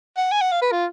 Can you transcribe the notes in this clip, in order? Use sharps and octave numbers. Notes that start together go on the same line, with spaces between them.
F#5
G#5
F#5
F5
B4
F4